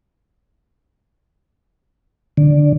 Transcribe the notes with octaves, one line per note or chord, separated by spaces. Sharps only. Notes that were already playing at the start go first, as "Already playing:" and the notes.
D3